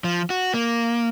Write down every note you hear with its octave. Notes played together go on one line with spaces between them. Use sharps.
F3
F#4
A#3